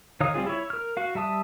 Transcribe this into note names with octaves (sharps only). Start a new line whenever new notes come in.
D#3 D#4 C#5 F5 D#6
G3 C4 F4 G#4
E4 C#5
A#4 F6
F#4 F5
G3 E5 A5 D#6